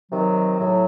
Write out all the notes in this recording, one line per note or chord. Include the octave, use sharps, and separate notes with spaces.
C3 D#3 F#3
A2 F#3